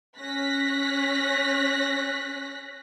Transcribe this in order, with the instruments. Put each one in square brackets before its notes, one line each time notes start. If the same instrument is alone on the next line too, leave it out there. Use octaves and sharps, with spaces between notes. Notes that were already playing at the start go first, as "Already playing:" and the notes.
[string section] C#4 F#6 A#6 B6